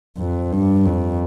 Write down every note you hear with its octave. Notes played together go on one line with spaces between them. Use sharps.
F2
G2
F2